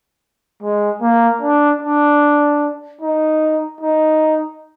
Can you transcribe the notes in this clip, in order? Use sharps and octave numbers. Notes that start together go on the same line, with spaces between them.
G#3
A#3
D4
D4
D#4
D#4